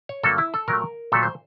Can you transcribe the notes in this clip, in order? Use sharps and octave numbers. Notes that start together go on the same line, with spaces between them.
C#5
G2 D3 F#3 A#3 A4
E4
A4
A#2 F#3 A3 A#4
A#2 F#3 A3 A4
C5